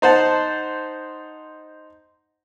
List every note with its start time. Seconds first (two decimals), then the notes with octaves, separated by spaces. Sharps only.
0.02 D#4 C5 F#5 A5